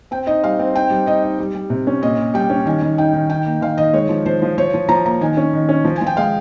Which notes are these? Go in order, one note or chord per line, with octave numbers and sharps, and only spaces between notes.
C4 G5
D#4 D#5
G3 F5
C4
D#4 G5
G3
D#4 D#5
D#4
G3
G3
C3
C#4
A#2 D#5
A#2
G3 G5
C#4
D#3 G#5
D#3
D#4 G5
D#3
D#4 G5
A#3
D#3 F5
D#3 D#5
G#3 C#5
F3
F3 C5
F3
F3 C#5
F3
F3 A#5
A#3 A#5
D#3 G#5
C#4
D#3
C#4
F3
G#5
F3
G5
G#3 F5